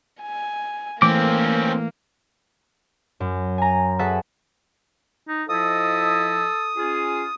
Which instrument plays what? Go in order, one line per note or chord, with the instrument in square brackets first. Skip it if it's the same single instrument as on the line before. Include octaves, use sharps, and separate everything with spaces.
[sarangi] G#5
[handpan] E3 A3 [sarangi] A#3 [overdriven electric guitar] C4 C#4 [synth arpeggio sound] D6
[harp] F#2
G#5 A#5
F#4 G#4 A4 B4 E5 F#5
[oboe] D#4
[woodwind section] F3 E4 D#5 [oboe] A4 [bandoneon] D#6
[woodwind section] C#4 F4 G#4